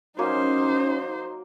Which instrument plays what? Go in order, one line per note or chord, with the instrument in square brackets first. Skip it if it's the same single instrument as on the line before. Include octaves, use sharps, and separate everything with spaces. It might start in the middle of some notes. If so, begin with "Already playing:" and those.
[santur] F#3 A#3 [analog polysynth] C#4 [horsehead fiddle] D#4 C5